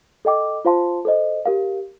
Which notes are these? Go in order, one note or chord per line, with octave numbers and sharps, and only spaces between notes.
A4 D#5 G5 D6
F4 C5 F5 A5 C6
A4 C5 D#5
G4 A#4 F5